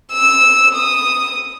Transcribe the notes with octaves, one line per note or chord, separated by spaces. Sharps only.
E6
D#6